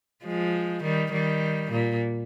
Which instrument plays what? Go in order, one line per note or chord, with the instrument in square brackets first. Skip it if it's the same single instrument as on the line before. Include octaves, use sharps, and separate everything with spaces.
[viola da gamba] F3 G#3
D#3 G3
D#3 G3
A#2